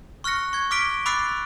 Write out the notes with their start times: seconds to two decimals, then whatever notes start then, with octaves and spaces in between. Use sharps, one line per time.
0.24 C#6 F6 F#6 A#6 C#7
0.53 C#6 G#6
0.71 D6 F6 B6 D7 G7
1.06 B5 D6 E6 F#6 A6 C7